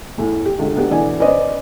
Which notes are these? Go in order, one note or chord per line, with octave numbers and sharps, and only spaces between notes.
E2 A2
G4
C#2 D3
A3 B3 D4 F#4 G4 A4
B2 D3 E3 B3 D5 G#5
C#4 B4 C5 D5 D#5